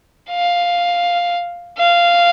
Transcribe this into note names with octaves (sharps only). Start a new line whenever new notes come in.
F5
F5